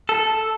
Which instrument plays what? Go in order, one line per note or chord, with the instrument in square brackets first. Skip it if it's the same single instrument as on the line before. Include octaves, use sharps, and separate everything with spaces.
[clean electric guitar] A4